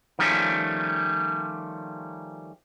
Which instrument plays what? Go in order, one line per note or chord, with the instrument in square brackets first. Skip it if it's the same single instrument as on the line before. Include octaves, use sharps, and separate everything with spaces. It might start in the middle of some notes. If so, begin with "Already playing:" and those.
[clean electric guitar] D#3 F3 G3 A3 C#4